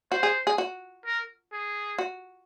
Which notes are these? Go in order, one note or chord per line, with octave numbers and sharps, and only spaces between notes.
F#4 C5
G#4
G#4
F#4
A#4
G#4
F#4